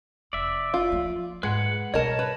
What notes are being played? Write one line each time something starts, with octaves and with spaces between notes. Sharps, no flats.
F1 D5 E5
F4
F3 A#3
G#2 G#3 B4 F#5
B2 G3 A#4 C#5 D#5 A5
B4